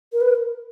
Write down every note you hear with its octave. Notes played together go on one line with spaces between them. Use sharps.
A#4
B4
A#4